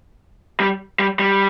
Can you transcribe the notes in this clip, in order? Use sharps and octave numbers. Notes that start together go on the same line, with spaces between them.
G3
G3
G3